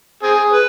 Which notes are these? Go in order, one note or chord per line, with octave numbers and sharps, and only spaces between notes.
C4 G#4
B4